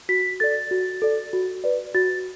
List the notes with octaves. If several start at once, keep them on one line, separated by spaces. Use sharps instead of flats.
F#4 B6
A4 D5 A6
F#4
A4 D5
F#4
B4 D5
F#4 A6